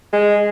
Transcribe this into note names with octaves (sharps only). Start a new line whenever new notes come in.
G#3